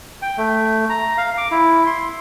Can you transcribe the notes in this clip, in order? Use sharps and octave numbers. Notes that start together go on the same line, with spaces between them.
G5
A3
A#5
F5
D6
E4
C6